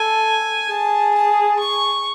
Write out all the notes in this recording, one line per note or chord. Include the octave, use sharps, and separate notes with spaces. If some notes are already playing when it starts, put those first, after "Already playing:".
Already playing: A4 G#5
G#4 A5
A5
C#6